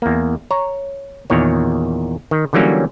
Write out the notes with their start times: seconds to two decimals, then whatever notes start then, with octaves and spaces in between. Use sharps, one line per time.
0.02 E2 A#3
0.51 C#5 A#5
1.30 E2 A#2 D#3 C#5
2.31 D#3
2.53 D3 E3 F#3 G3 A#3 C#4